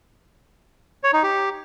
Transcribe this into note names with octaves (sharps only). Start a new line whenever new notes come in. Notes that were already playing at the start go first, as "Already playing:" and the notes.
C#5
D#4
G4